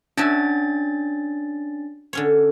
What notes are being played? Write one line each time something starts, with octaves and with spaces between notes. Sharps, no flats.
C#4 D4 F#4 E5 A5 A6
D3 C#4 C#5